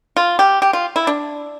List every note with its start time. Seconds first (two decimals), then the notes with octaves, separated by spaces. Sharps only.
0.17 F4
0.39 G4
0.62 G4
0.73 F4
0.96 E4
1.07 D4